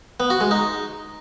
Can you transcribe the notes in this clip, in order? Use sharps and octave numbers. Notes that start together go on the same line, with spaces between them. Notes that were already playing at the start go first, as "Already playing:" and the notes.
B3
F#4
G#3
D#4